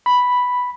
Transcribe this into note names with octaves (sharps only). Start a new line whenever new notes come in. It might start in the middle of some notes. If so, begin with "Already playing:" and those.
B5